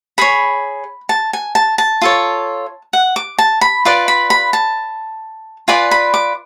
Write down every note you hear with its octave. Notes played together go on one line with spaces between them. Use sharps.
G#4 C#5 B5
A5
G#5
A5
A5
F4 A4 C#5
F#5
D6
A5
B5
F4 B4 D5 D6
B5
B5
A5
F4 B4 D5 G#5
B5
D6